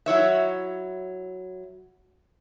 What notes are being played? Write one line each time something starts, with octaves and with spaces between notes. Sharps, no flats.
F#3 E4 C#5 E5